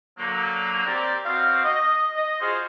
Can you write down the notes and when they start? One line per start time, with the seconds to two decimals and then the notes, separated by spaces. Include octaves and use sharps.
0.18 D3 F#3 A#3
0.86 C4 G4 A#4 D5
1.25 B2 C4 F#4 F5
1.64 D#5
2.15 D#5
2.40 F4 F#4 G#4 C5